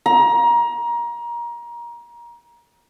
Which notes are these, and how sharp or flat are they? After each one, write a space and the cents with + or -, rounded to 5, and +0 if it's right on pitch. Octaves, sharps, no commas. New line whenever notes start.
A#5 +25